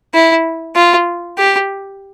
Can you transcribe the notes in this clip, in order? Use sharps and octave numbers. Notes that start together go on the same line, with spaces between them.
E4
F4
G4